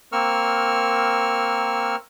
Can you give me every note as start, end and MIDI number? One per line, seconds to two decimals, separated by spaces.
0.12 1.96 58
0.12 1.96 60
0.12 1.96 70
0.12 1.96 85
0.12 1.96 88
0.12 1.96 89